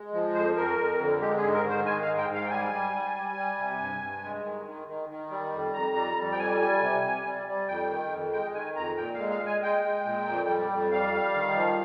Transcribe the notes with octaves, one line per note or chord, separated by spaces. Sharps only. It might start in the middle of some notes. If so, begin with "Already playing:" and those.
Already playing: G#3
F3
F2 C5
F2 A#4
F2
D3
G#3 G4
G#4
G#2
A#4
D#3
C5
G#3 G#5
F5
G#2
G5
G#2
F5
G5
G3 G#5
G3
G3
G3
G3
C3
G2
G2
G#3
D#3
D#3
D#3
D#3
G3
F2
F2 A#5
G3
F2
G5
G3 G#5
G3
C3
C3
G3
G3
F2 G5
D#3
F2
G#3 G5
D#3 G#5
F2 A#5
A#2 G5
F5
G#3
F5
G#3
G#5
G#3 G5
G#3
A#2
F2
G3
F2
G3 F5
G3
D#3
F3